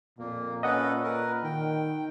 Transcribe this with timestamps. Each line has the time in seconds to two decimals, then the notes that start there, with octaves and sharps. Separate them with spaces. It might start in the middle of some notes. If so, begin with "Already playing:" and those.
0.19 F2 A#2 A#3
0.63 C#4 A4 B4 D#5 F#5
1.03 A#4 B4
1.44 D#3 G5